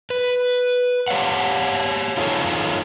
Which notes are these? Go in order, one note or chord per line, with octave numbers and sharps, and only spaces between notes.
B4
G4 C#5 F5 F#5
D#4 F4 G#4 A4 C#5 F5